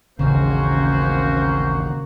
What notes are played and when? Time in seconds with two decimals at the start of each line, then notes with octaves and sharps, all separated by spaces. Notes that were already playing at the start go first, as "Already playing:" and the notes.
0.19 A1 D#2 C#3 A#3 C4 C#4 F#4 C5